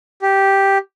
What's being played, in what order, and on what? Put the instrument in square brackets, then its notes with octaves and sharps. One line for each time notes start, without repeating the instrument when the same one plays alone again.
[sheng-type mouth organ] G4